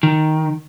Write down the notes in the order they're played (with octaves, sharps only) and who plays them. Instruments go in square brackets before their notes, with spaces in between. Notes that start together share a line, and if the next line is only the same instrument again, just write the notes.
[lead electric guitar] D#3